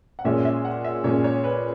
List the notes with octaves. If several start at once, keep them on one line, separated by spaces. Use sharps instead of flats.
F#5
A#2 G#3 C#4 E5
E5
F#5
E5
A#2 G#3 C#4 C#5
C#5
B4